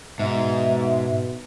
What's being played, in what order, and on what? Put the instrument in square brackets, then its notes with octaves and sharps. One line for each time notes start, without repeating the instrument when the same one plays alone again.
[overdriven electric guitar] G#2 [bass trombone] B2 [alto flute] E5